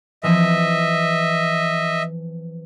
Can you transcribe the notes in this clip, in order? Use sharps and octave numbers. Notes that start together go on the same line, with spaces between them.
E3 F3 C4 D#5 E5